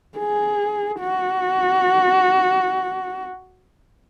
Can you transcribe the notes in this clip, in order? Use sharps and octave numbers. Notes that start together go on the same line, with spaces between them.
G#4
F#4